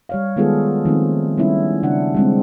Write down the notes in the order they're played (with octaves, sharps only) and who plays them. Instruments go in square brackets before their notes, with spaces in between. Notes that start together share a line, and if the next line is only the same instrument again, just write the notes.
[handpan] G3 C#5 F5
D#3 G#3 B3 F4 G#4 A4
D#3 F3 A3 C4
G3 B3 C#4 E4
C#3 D4 F#5
G3 G#3 C4